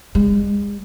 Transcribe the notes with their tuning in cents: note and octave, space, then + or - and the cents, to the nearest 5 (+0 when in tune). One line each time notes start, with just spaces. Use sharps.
G#3 -40